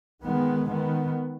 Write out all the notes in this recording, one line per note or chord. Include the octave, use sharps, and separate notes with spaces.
D#3 G#3 B3
D#3 B3